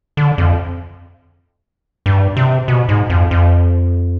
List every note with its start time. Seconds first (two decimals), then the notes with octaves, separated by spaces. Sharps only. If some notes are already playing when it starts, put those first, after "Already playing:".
0.17 D3
0.38 F2
2.06 G2
2.37 C3
2.68 B2
2.89 G#2
3.10 F2
3.31 F2